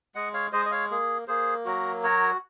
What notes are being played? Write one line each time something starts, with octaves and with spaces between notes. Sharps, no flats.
G#3 D#5 F#5
C#5 F5
G#3 C5 D#5
D#5
C#5 F5
A#3 G#4
A#3 G#4 C5
F#3 F#4 A#4
F#4 A#4 C#5